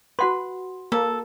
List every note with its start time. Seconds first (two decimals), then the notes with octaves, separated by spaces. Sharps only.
0.19 F#4 B4 F#5 C6
0.92 A#3 A4